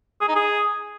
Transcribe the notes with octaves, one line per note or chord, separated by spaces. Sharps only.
G#4
D#4
G#4